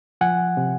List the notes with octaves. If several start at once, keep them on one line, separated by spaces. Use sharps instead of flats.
F3 F#5 G#5
C3